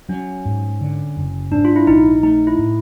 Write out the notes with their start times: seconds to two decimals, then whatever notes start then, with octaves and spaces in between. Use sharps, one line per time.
0.09 F#3 C#4
0.45 G#2
0.81 D3
1.17 F#1
1.51 G#2 D4
1.65 F4
1.76 E4
1.87 A#1 D#4
2.23 A3 D#4
2.47 E4
2.59 A2